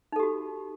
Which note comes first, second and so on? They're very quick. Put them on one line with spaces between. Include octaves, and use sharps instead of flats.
D#4 A4 G4 F#4